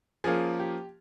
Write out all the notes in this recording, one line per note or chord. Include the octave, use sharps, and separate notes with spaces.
F3 A#3 C#4 F4 G#4
G4